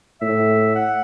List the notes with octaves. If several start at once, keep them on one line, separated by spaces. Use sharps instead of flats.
A2 E5
F#5